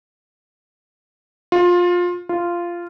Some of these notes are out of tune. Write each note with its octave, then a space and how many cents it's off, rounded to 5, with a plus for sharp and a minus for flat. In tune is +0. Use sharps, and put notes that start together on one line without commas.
F4 +20
F4 -10